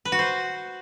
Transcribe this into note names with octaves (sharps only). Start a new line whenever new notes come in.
B4
F#4
C5